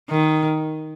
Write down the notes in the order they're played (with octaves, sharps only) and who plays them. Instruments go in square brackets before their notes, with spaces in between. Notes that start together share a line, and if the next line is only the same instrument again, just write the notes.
[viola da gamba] D#3